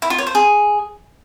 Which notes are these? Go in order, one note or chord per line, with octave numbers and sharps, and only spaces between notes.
E4
F4
C#5
C5
G#4